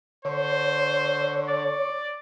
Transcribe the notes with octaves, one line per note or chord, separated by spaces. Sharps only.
D3 C5 C#5
D5